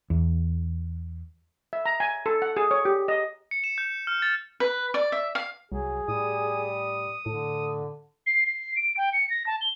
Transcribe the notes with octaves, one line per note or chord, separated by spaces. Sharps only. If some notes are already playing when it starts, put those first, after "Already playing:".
E2
E5
A#5
G#5
A4
F#5
G#4
C#5
G4
D#5
C#7
E7
G6
F6
A6
B4
D5
E5
F5
C2 F#3 G#4
A2 G3 D#6
A2 D3 A4
C7
C7
D7
G5
C#7
A#6
A5
G7